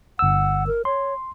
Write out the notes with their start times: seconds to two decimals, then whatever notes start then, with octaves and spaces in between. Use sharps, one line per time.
0.19 G1 F#5 E6
0.67 A#4
0.85 C#5 C6